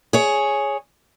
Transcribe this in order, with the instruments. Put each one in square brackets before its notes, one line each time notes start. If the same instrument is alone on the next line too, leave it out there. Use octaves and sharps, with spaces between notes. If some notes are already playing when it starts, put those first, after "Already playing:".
[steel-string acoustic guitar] G#4 C#5